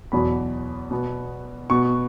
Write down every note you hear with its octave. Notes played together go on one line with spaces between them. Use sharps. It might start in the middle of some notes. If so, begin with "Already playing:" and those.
E2 B2 F#3 B5
B2 B3
B2 B3 C#6